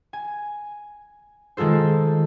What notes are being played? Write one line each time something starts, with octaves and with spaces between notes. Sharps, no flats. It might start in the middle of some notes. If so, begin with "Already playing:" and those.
G#5
D#3 G#3 F4 A4 C5